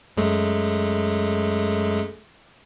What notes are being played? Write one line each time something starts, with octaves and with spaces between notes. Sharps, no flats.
F#2 G#3 A3